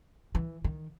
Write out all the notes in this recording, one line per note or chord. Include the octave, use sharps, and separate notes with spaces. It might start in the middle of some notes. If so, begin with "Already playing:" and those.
E3
D#3